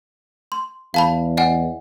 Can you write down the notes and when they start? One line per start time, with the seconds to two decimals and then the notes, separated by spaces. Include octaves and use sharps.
0.52 C6
0.94 E2 F5 A5 B5
1.37 D#5 F#5 G#5